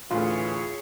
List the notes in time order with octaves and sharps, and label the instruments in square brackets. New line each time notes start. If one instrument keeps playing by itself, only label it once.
[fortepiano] A1 D2 [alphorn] E3 [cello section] E4 G#4 C#5 [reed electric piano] F4